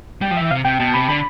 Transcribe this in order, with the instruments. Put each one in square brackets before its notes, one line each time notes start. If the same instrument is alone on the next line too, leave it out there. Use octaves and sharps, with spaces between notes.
[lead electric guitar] G3 [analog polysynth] G5
[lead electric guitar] F3
[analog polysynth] E5
[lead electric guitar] E3
[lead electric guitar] C3 [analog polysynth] F5
[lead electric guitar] C3 [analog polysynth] G5
[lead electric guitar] B2 [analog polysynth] A5
[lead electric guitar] C3 [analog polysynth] B5
[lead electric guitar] D3 [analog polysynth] B5